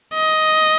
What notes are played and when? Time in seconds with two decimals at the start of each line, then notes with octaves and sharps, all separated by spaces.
0.14 D#5